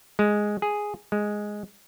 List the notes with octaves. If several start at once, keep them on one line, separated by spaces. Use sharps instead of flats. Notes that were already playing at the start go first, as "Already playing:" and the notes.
G#3
G#4
G#3